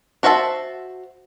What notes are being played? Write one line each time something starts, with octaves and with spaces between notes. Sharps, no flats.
D4 F#4 C5 E5 A5